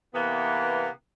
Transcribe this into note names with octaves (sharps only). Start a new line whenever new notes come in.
C3 E3 A#3 B3